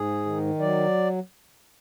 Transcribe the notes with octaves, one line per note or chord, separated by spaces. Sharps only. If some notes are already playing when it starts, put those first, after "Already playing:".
Already playing: G#2 G#4
D#3
F#3 D5